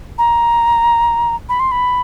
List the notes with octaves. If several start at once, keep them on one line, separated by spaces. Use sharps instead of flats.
A#5
B5
C6
B5